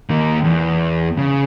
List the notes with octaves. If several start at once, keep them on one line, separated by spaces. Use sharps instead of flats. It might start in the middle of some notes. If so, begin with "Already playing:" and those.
D#3 A#3
E2
C#3